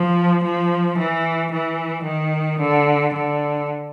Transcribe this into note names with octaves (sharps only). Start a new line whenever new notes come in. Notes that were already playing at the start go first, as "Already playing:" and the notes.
Already playing: F3
F3
E3
E3
D#3
D3
D3